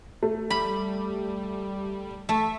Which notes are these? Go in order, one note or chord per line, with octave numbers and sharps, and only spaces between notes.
A3
G3 B5
A3 E5